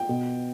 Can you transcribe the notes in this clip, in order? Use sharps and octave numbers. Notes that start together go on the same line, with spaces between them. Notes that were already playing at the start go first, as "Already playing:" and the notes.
Already playing: G5
B2